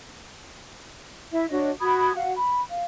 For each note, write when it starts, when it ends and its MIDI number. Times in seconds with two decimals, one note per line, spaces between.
1.32 1.46 64
1.32 1.46 76
1.51 1.70 62
1.51 1.70 66
1.51 1.70 73
1.51 1.70 75
1.81 2.12 66
1.81 2.12 83
1.81 2.12 87
1.81 2.12 92
2.16 2.35 66
2.16 2.35 77
2.16 2.35 78
2.37 2.62 83
2.69 2.85 77